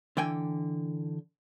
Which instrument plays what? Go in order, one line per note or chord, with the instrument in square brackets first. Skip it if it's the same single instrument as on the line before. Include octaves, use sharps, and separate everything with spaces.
[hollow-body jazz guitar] D3 E3 G5 G#5